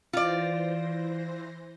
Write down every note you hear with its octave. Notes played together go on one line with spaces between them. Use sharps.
E3 F4 C5 D5 A#6